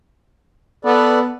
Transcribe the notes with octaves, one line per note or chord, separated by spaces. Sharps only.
B3 A4 B4 D5